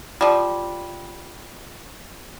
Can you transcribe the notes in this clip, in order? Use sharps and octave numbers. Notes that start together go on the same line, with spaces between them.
F3 G3